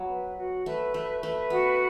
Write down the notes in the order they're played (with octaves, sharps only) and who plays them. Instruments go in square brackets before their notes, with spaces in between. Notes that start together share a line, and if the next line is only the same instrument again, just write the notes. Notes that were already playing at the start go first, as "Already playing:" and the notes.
Already playing: [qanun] F#3 B3
[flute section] B4
F#4
[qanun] A3 [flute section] B4
[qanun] A3 [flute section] E5
[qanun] A3 [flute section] B4
[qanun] B3 [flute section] F#4